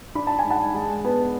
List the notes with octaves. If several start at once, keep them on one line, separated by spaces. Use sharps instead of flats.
D4 B5
A5
G#5
G#2
F#5 A5
G#3
B3